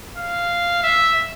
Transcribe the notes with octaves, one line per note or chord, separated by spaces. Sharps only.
F5
E5